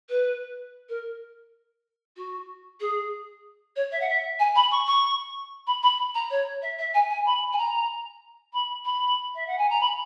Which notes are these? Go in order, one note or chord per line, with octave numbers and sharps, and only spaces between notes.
B4
A#4
F#4
G#4
C#5
E5
F#5
E5
G#5
B5
C#6
C#6
B5
B5
A#5
C#5
E5
E5
G#5
G#5
B5
G#5
A#5
B5
B5
E5
F#5
G#5
A#5
B5